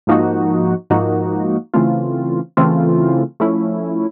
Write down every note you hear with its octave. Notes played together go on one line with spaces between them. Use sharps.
G#2 F3 A#3 D#4 F#4
G#2 F3 A#3 D#4 F#4
C#3 E3 A3 C4 F4
C#3 E3 A3 C4 F4
F3 A3 C#4 E4